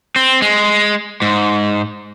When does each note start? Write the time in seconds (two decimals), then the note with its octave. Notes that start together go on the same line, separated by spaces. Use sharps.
0.16 C4
0.42 G#3
1.22 G#2